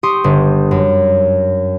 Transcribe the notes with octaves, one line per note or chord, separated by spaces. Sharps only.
G4 C6 C#6 D#6
G1
F#2